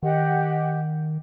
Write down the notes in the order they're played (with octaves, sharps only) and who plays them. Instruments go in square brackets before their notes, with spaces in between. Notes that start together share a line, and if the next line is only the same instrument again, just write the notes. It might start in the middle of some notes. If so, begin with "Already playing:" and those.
[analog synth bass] D#3 [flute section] G4 D#5 F#5